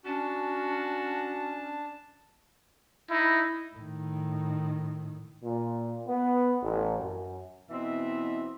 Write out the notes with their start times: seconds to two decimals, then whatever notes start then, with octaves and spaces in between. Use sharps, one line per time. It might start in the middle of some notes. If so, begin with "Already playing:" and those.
0.05 C#4 D4 F#4 A5
3.11 D#4 E4
3.75 A2 D#3
5.43 A#2
6.06 B3
6.63 A1
6.99 F#2
7.70 B2 E3 C4 D#5 E5